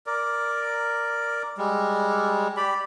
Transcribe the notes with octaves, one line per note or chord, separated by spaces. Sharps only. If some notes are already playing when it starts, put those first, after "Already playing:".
A#4 D5
G3 G#3
G4 D5 B5